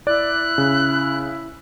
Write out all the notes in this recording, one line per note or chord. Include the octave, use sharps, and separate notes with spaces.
E4 D5 F#6
C#3